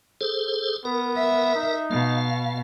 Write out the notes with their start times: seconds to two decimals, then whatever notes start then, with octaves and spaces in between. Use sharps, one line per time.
0.21 G#4 A4 C5
0.85 B3 A#4
1.16 E5
1.56 D#4
1.91 B2 F5